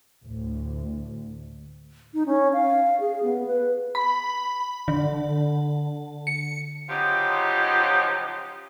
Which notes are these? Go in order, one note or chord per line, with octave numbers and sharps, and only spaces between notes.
D2 A2
D#4
C#4
F5
G#4
B3
B4
B5
D3
C#7
C#3 F3 F#3 D#4 F4 G4